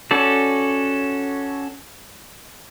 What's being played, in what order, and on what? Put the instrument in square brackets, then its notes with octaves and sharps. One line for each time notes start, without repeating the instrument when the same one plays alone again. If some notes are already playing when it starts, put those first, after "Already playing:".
[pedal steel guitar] C#4 F#4 A4 D5